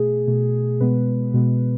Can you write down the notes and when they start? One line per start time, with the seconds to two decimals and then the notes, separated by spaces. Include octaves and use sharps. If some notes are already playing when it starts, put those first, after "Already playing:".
Already playing: B2 A3 G#4
0.27 B2 A3
0.80 B2 G#3 B3 B4
1.34 B2 G#3 B3